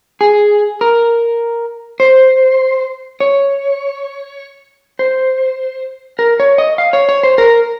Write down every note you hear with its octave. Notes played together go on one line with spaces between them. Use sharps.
G#4
A#4
C5
C#5
C5
A#4
C#5
D#5
F5
C#5
C#5
C5
A#4